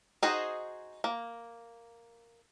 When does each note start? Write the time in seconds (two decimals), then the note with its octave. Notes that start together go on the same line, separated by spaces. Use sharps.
0.23 D#4 F#4 G#4 C5 D#5
1.04 A#3